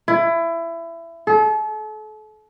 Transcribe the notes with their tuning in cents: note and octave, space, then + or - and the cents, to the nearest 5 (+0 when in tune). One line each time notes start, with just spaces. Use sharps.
E4 +20
A4 -40